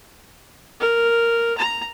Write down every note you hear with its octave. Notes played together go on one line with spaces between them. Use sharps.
A#4
A#5